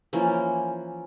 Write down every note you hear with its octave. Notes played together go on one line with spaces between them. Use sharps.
E3 F3 A#3 C#4